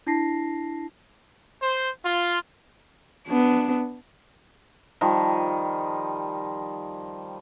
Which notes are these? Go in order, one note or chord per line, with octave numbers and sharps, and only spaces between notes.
D4 E4 A5 A#6 C7
C5
F4
B3 D4
D#3 F3 G3